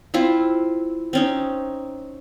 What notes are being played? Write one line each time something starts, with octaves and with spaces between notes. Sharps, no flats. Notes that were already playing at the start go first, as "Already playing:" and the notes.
C4 E4 F4
C4 C#4 D#4